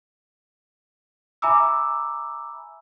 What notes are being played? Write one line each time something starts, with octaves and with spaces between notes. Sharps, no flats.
E5 G#5 A#5 B5 D6 E6